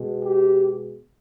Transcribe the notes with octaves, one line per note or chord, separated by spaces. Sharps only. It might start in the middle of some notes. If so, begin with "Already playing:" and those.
Already playing: B2 G#3
G4